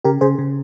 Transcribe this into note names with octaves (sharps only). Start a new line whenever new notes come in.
C#3 G4 A#4
C#3 G#4 C5
C#3